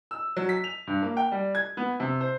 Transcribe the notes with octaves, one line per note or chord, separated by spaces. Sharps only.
E6
F#3
B6
F7
G2
A#3
G5
G3
G#6
B3
C3
C5